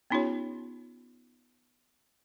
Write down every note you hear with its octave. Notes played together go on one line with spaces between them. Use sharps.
B3 C#4 D#4 F4 G4 C#5